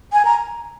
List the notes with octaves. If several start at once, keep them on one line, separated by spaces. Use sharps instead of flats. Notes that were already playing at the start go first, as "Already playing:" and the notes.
G#5
A#5